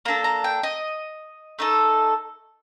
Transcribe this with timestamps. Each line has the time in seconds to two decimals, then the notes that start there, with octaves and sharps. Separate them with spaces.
0.05 A#3 D4 A4 A#5
0.24 A#5
0.44 G5
0.63 D#5
1.59 A3 D#4 A4